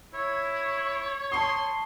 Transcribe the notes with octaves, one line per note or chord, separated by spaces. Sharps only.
E4 C#5
A5 C6 C#6 D#6